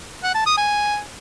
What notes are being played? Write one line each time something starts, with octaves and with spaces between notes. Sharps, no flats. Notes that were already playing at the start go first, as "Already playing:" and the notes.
F#5
A5
D#6
G#5